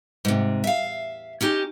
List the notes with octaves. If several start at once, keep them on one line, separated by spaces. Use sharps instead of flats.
G#2 C3
E5 F5
C#4 D#4 G4